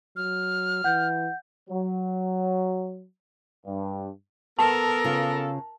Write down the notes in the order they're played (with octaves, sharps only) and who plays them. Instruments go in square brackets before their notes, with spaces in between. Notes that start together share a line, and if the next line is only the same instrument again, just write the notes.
[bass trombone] F#3 [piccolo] F6
[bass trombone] E3 [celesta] F#5 G6
[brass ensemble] F#3
G2
[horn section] B3 A4 [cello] A#4 [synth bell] A5
[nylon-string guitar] C#3 F4